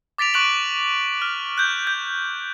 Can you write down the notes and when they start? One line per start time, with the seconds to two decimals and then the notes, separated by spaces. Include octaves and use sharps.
0.18 D6 A6 B6 D7 F7
0.34 C#6 F#6 D7 F#7
1.22 F6
1.58 F#6 G6
1.87 G6